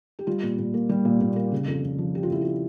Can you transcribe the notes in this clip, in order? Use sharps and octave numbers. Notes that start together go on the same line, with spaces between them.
G4
G3 F4
A#2
A#2
A#3
G3 G4
A#2
A#2
A#3
C#3
F2
F2
F3
C#3 G4
F4
F2 E4
F4